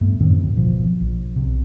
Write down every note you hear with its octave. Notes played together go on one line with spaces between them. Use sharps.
G2 A3 B3
F#2 A2 D#3 C4
D2
G#1 B2 F3 B3
A#1
B1 C3